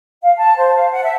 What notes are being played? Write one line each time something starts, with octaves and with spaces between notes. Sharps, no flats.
F5
A5
C5
F5
F#5
E5